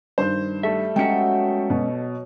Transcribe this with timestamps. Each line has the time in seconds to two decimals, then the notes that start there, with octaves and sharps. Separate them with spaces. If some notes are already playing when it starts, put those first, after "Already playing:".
0.18 G2 D#3 C5 G6
0.63 G3 A3 A4 E5
0.96 F#3 G#3 B3 C#4 D#5 E5 G5 C#7
1.70 B2